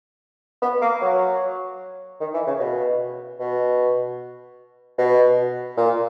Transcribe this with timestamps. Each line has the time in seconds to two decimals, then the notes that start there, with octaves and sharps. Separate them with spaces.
0.62 B3
0.81 A#3
1.02 F#3
2.20 D#3
2.34 E3
2.47 C#3
2.60 B2
3.39 B2
4.98 B2
5.77 A#2